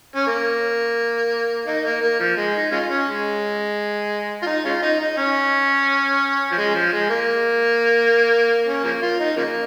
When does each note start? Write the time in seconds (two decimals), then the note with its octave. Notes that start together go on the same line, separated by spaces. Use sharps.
0.16 C#4
0.27 A#3
1.67 A#3 D#4
1.85 A#3
2.01 A#3
2.20 F3
2.37 G#3
2.54 D#4
2.72 G#3 C#4 F4
2.90 C#4
3.07 G#3
4.42 F4
4.46 D#4
4.65 G#3 C#4 F4
4.82 D#4
5.00 D#4
5.17 C#4
6.51 F3
6.57 G#3
6.74 F3
6.92 G#3
7.09 A#3
8.67 C#4
8.84 C#3 F3 A#3
9.02 F4
9.20 D#4
9.36 C#3 F3 A#3